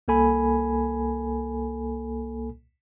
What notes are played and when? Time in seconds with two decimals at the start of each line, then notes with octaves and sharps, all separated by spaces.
0.08 C2 A#3 A4 G#5 B5